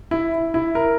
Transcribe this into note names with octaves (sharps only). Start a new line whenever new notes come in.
E4
E4
A#4